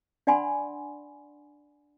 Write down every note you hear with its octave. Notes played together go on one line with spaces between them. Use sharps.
D4 D5 F#5 G#5 B5 C6